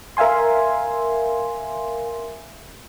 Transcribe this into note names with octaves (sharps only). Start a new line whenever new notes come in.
A#4 E5 F5 G#5 C6